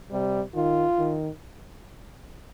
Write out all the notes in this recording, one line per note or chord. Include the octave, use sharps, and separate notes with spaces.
C3 G3
D#3 F4
D#3